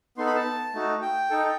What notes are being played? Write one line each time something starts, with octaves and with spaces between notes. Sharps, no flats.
B3 D#4 A4 C6
B5
A5
A3 D#4 F#4
G5
D#4 A4